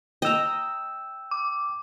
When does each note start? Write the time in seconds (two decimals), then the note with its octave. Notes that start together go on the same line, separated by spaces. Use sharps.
0.22 D#5 G5 A#5 E6
1.31 D6